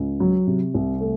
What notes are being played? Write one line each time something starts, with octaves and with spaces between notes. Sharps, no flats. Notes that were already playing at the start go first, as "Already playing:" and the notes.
Already playing: C#2
F#3
C3
C2
A3